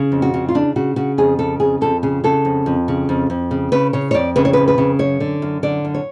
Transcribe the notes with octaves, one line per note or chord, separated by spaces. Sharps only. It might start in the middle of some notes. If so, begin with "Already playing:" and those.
Already playing: C#3
F2
F#4
C#3
F4
C#3 D4
C#3 F#4
C#3 F#4
F2 G#4
C#3 A4
F2 G#4
F2 A4
C#3 G#4
C#3 A4
F2
F2
C#3
F2
F2
C#3
C#3 B4
C#3 C#5
C#5
F2 D5
C#3 B4
C#5
F2 B4
B4
C#3
F#2 C#5
D3
F#2
D3 D5
F#2
C#5